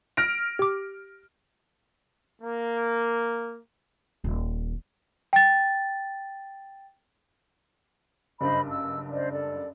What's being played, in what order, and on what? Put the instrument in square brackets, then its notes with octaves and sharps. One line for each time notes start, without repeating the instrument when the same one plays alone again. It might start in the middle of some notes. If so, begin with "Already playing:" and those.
[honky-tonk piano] F6 A#6 D7
[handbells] G4 D6
[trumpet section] A#3
[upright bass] D#1
[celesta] G5 A6
[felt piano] F#1 G2 [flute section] C5 D#5 B5
[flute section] E6
C5 D5 D#5
A4 D5